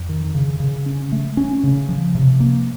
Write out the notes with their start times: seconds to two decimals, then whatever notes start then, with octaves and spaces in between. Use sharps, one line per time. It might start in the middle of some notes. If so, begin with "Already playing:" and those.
Already playing: F2
0.09 D#3
0.35 C#3
0.60 C#3
0.86 C#4
1.12 A3
1.37 C#4
1.64 C#3
1.89 F3
2.15 C3
2.40 A#3